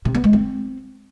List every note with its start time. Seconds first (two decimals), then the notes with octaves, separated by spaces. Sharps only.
0.05 C3
0.15 B3
0.24 G#3
0.33 C4